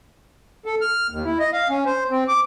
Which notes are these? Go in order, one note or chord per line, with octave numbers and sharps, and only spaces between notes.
A4
F6
D#2
E4
D#5
F5
C#4
C5
C4
D6